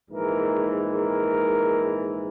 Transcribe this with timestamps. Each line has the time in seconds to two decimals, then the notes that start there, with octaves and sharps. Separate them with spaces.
0.11 A#1 G#2 E3 A#4
0.89 A#4